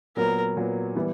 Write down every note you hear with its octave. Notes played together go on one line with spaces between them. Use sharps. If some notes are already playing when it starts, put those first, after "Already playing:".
A#2 F#3 B3 A#4
A#2 F#3 B3
E3 G3 B3 E4